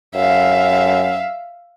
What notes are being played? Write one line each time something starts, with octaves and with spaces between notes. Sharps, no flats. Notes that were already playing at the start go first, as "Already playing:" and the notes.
F#2 E5 F5